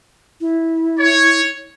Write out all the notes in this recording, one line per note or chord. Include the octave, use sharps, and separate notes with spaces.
E4
C#5